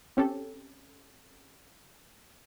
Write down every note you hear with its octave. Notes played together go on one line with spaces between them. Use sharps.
C4 C#4 G4 A4